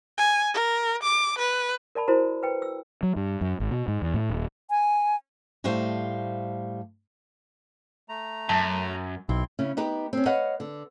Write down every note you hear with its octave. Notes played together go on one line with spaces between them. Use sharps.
G#5
A#4
D6
B4
A#4 D5 A5 B5
E4 F#4 A#4 C5 A#5
B4 G5
E6
F#3
G2
F#2
G#1
B2
G#2
E2
A2
D#1
G#5
A2 G3 A3 C5 F5
A3 A#5
F#2 A5
B1 C4 E4 C6
C#3 C#4 E4
B3 D#4 G4 B4
C4 C#4
B4 C#5 D#5 F5 F#5
D3